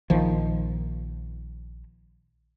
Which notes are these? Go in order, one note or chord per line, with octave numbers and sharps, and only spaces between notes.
A#1 D#3 F3